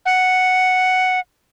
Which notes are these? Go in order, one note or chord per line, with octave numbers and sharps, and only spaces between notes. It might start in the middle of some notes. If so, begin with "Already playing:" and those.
F#5